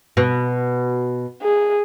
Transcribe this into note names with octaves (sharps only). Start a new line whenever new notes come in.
B2
G#4